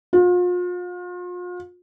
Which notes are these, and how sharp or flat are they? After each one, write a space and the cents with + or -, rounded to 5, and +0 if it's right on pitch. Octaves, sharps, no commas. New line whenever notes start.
F4 +40